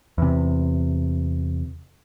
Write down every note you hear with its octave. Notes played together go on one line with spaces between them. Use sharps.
E2 C3